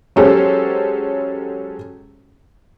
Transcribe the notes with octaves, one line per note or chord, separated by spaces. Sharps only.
F#3 G#3 C#4 G4 A4 C5